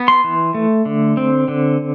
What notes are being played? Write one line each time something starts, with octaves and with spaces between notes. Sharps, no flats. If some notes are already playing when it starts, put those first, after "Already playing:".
Already playing: B3
C6
E3
A3
D3
C4
D3